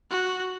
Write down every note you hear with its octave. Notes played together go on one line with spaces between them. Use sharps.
F#4